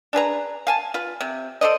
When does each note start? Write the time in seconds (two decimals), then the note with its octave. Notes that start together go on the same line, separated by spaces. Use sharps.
0.13 D4 G#4 B4 A#5
0.67 F5 G#5 A5
0.94 F4 B4
1.21 C3
1.61 A4 C5 D5 D#5